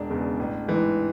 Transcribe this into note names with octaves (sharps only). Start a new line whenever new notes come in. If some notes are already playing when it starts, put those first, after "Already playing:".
Already playing: E1 D4
E2 C#3
A1
G#2 E3